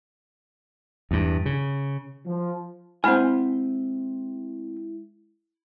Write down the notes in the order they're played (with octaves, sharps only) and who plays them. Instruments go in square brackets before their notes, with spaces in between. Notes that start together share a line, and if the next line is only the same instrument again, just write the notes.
[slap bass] E2 G2
C#3
[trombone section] F3
[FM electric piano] G#3 E4 [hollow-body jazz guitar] C4 G#5 [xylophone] F#5 B5 F6